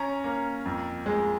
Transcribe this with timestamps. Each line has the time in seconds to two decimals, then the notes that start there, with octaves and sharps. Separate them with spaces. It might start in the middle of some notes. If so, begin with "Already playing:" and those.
Already playing: C#4 A#5
0.24 A#3
0.66 F2
1.06 G#3